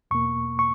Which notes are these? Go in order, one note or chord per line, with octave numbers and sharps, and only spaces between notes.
E2 B2 A#3 C#6
C#6